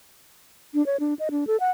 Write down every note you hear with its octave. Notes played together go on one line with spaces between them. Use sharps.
D4
C#5
D4
D#5
D4
A4
F#5